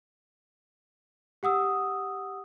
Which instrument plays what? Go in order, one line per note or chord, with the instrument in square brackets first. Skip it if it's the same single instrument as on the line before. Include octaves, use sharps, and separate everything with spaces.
[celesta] G4 F#5 D#6 E6